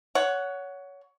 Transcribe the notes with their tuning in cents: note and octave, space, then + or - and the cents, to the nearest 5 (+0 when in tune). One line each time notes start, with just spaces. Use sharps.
C#5 +20 F#5 +0